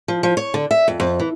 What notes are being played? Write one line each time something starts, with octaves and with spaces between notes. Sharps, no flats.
F3
F3
C#5
D3
E5
F2
F2
E3